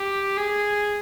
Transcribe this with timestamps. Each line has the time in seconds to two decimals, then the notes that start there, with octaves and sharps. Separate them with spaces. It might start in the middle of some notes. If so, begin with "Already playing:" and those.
Already playing: G4
0.37 G#4